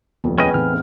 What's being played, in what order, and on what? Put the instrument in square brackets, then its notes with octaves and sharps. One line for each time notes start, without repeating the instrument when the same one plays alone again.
[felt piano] D#1 F2 [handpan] B3
[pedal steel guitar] C#4 D#5 [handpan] G#4 [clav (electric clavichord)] B4 G5 G#5
[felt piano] E2 A2 [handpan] C4 D#4 [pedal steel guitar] F6